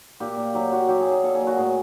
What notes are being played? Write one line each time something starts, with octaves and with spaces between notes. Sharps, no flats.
A#2 G4
A#2
F#3 G4
F#3 F#4
F#3 G4
G#4
F#3
G#4
A#2 A4
G#4
F#3
F#4
A2 G#4